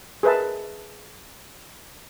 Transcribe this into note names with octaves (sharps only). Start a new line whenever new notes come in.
G#4 A#4 B4 E5 A5